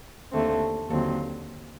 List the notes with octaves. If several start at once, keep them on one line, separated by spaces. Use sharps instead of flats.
D#2 D3 A3 C4
D#2 D3 F#3 C4 A4